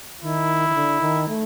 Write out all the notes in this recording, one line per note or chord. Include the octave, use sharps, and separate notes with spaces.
D#3 E4
D#3
D3
D#3
A3